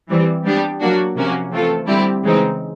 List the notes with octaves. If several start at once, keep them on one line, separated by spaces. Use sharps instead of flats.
E3 G3 C4
G3 B3 D4 G4
F#3 A#3 D4 F#4
C3 F3 A#3 C#4 F#4
E3 A3 C4 F4 A4
D3 G3 C4 E4 G4
C#3 E3 G#3 C4 D#4